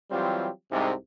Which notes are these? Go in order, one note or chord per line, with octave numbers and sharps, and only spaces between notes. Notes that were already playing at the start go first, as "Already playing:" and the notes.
E3 F#3 G3 C4 F4 G4
C2 G#2 C3